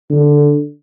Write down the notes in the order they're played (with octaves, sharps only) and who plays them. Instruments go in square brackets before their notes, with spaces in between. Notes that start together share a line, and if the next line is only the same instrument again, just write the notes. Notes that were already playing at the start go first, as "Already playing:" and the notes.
[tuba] D3